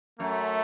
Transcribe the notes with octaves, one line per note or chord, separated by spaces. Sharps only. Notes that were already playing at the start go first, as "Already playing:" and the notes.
F#2 A3